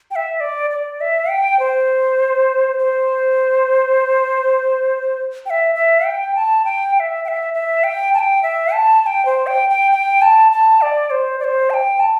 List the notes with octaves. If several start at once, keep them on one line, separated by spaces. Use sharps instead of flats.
G5
E5
D5
D5
E5
G5
C5
C5
G5
E5
E5
G5
A5
G5
G5
E5
G5
E5
E5
G5
A5
G5
E5
A5
A5
G5
C5
G5
G5
G5
A5
A5
D5
C5
D5
C5
A5
G5
A5